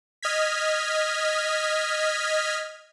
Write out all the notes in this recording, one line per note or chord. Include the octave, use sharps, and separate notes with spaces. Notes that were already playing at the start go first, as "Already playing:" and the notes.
D#5 F6 G#6 B6